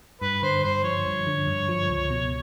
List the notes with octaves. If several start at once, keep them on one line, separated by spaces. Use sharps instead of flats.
G2 B4
D3 C5
G2 C5
F3 C#5
G2
D3
G2
F3
C#2
B2